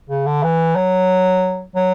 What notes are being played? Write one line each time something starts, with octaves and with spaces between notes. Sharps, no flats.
C#3
D3
E3
F#3
F#3